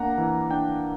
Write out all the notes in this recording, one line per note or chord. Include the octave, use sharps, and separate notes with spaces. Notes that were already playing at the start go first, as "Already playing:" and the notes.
Already playing: A#3 D4 F#5 A#5
E3
D4 G5